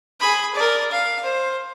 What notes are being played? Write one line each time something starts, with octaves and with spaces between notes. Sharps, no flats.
G#4 B5
A#4 D5
F5
C5